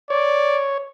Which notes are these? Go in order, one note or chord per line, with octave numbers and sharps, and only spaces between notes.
C#5 D5